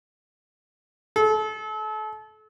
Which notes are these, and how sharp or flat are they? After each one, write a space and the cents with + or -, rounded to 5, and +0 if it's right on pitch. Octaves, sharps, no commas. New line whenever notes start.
A4 -35